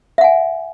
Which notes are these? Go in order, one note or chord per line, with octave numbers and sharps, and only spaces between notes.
E5 F#5 G#5